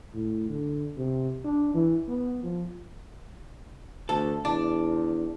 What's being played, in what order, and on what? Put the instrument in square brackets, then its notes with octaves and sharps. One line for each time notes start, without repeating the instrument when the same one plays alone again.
[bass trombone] A2
D3
C3
D4
E3
B3
F3
[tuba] D2 [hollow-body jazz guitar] A4
[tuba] E2 [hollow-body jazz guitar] D4